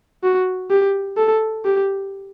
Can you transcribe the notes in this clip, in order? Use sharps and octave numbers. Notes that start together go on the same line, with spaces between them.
F#4
G4
A4
G4